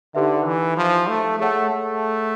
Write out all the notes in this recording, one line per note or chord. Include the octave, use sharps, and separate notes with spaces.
D3 D#4 G4 B4 E5
E3
F3
A3
A3 G#4 C#5 F#5
A3